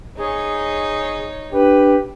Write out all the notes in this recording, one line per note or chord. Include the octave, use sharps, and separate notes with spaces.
D#4 G#4 C#5
D4 G4 B4